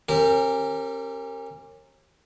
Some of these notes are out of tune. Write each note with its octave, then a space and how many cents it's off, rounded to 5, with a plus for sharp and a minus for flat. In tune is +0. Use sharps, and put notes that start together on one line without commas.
C#4 -40 G4 -5 A#4 -25